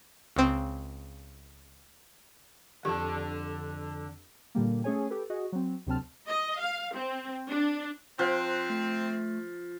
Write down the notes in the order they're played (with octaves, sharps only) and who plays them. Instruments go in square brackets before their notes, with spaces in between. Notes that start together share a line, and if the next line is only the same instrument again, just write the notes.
[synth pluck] C#2 C4
[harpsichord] F2 [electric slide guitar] D3 A5 [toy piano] G4
[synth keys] A#2 D3 G3 A#3
A3 C#4 G#4 C#5 G#5
G4 A4 B4
F#4 G#4 D#5
F#3 C4
D2 C3 F#3 C4 A5 F6
[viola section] D#5
F5
C4
D4
[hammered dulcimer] F3 [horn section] C4 [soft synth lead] F#6
[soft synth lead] A3